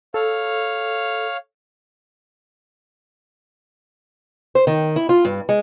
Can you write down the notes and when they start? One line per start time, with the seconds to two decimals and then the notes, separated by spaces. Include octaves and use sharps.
0.14 A4 C#5 F5
4.55 C5
4.67 D#3
4.96 E4
5.09 F4
5.25 G2
5.49 G#3